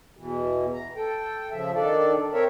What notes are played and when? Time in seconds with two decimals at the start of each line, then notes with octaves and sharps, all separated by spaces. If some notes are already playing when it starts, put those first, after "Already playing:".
0.17 E2 B2 E3
0.74 A#5
0.96 A4 G5
1.51 C#3 F3 E5
1.74 D#3 D4 A4 D5
2.33 C4 A#4 C#5 E5